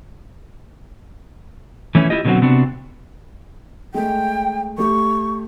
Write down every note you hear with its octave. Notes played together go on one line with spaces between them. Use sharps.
E3 A3 C#4 E4
E4 F4 G4 D#5
B2 D3 F#3 A#3 C4 F#4
C3 B3 C4 D4 F#4
G#3 A3 G5
A3 G4 C#6